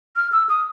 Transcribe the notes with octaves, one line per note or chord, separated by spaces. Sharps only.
F6
E6
D#6